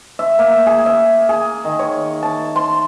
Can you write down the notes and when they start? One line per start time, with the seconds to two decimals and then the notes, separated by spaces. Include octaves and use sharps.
0.19 E5
0.39 A#3
0.67 G#4
0.86 E5
1.29 G#4
1.65 D#3
1.79 C#5
2.23 A5
2.56 C6